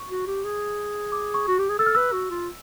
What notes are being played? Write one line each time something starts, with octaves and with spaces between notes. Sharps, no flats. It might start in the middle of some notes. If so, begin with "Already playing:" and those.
Already playing: C#6
F#4
G4
G#4
D6
C#6
F#4
G4
G#4
A4 E6
F6
B4 E6
F#4
F4